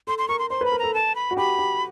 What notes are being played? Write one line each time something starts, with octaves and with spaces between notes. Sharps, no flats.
A4 C6
C6
A#4 C#6
C6
C5 C6
B4
B5
A#4
A4 A#5
A5
B5
F#4
G4 B5
G4